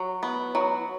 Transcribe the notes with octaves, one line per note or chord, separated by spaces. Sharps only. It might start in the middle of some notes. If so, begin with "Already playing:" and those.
Already playing: F#3
B3
F#3